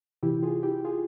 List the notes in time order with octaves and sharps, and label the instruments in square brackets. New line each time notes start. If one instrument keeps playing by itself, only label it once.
[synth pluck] C3 E3 E4 G4
F4 G#4
E4 G4
F4 G#4